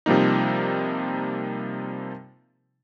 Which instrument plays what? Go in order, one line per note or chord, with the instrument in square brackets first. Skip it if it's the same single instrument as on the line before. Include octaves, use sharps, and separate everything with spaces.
[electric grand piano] C3 F3 G3 A#3 D#4